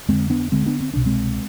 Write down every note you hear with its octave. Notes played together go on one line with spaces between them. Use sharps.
F2 D3 G#3 C4
B3 D4
D2 D3 G#3 C4
B3 D4
C4
C2 B2 D4
G#3 C4